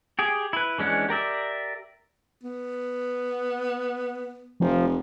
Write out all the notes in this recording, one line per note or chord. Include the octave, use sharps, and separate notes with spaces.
G4 G#4
E4 B4
E3 G#3 C#4 D4 F#5
G4 A#4 D5 E5
B3
F1 F3